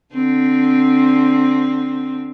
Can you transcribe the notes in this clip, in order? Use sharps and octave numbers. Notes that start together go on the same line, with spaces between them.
D3 C4